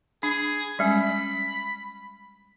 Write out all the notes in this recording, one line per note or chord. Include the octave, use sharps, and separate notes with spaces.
D4 G#4
G3 G#3 C#4 B5